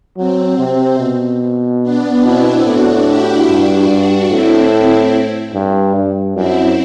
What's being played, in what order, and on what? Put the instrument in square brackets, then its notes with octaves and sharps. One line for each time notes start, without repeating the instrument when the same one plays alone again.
[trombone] F#3 [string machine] C4
[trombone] C3
B2
[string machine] B3 D4
[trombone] B2 [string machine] C4 E4
[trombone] A2 [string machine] D4 F#4
[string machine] E4 G4
[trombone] G2 [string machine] D4 F#4
[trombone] G2
[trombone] A2 [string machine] C4 E4
[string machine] C4
[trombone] G2
G2
[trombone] F#2 [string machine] C4 E4